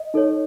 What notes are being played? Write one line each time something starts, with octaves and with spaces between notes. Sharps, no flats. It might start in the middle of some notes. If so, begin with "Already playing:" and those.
Already playing: D#5
D#4 A4 C#5